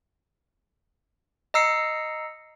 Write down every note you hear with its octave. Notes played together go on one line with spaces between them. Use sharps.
D#5 A#5 E6 C7 C#7